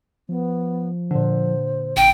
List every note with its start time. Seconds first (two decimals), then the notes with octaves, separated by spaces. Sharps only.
0.29 F3 B3
1.11 A#2 D3 C5
1.97 A1 G5